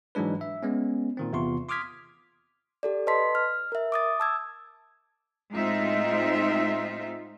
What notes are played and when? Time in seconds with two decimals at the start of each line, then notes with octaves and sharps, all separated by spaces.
0.15 G#2 E3 F#3 G#3 D4 B4
0.41 E5
0.63 G#3 B3 C#4
1.17 A#2 D#3 C4
1.33 E2 C3 F4 C6 C#6
1.69 C6 D6 D#6 F6 G#6 B6
2.83 G4 A4 D5
3.07 B4 D#5 A5 C6 B6
3.35 F6
3.72 A#4 E5
3.92 D6 D#6 A6
4.20 A5 E6 G#6
5.53 A2 G#3 C4 D#4 F4 E5